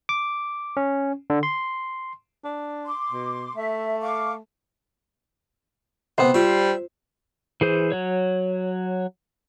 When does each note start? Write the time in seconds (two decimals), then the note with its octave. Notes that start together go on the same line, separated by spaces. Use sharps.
0.09 D6
0.77 C#4
1.30 D3
1.43 C6
2.44 D4
2.85 C6 D6
3.11 B2
3.56 A3 E5
4.01 F5 C#6 D6
6.18 C3 B3 C5
6.34 G3 F4 E5
7.61 E3 G#4 C5
7.92 F#3 C#5